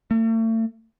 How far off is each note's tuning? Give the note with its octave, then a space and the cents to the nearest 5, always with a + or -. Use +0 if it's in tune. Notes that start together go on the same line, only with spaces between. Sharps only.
A3 +40